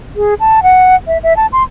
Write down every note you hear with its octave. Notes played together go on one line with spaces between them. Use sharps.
G#4
A5
F#5
E5
E5
A5
C6